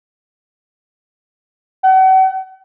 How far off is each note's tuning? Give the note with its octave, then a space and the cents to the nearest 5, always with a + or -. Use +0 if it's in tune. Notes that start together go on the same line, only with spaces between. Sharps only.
F#5 +40